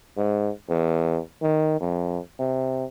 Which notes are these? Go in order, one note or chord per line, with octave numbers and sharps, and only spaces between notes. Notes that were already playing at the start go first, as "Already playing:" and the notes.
G#2
E2
D#3
F2
C3